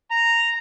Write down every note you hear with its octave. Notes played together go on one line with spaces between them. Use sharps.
A#5